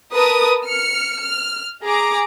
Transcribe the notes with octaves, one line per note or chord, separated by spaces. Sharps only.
A#4 B4 A5 D#6
F6 C#7
F6
G#4 A#5 D6